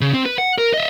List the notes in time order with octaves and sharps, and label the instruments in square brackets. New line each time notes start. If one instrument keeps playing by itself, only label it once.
[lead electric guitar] C#3
C4
B4
F#5
A#4
D#5 E5